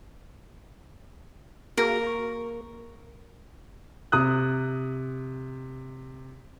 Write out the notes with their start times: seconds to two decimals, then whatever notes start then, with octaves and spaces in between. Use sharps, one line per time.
1.78 A#3 F#4 G#4 A#4
2.04 A#5 C#6
4.12 C3 D#6 F#6